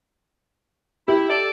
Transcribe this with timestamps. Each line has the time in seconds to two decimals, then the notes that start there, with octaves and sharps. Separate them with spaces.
1.08 E4 G4
1.30 A4 D5